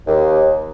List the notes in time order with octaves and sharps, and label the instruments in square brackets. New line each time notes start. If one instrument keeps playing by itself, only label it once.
[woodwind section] D#2